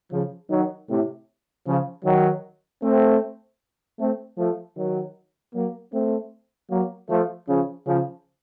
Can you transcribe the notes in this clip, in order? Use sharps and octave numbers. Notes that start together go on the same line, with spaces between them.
C#3 F3
D#3 F#3
A2 C3
C#3 F3
D#3 F#3
A3 C4
A3 C4
F3 A3
D#3 F#3
F#3 A#3
A3 C4
F#3 A#3
F3 A3
C#3 F3
C#3 F3